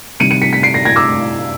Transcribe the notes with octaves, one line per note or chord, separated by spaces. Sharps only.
C3 D#3 G3 C#7 D#7
C#7 D#7
B6 C#7
B6 C#7
C7 D7
A#6 C7
G#6 A#6
D6 E6